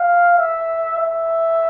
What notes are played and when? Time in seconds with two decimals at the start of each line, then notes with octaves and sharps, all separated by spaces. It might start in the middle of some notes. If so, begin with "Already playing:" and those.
Already playing: F5
0.38 E5
1.00 E5